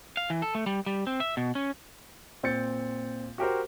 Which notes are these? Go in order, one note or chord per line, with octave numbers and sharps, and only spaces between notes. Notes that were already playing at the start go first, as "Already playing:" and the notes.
F5
E3
A4
A3
G3
G3
C4
E5
B2
C#4
A#2 C4 G6 A6 C#7
F#4 G4 A#4 C5